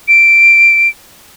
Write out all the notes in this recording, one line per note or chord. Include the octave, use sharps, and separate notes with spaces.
D7